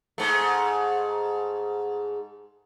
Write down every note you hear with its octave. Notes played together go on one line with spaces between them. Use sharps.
G#2 A3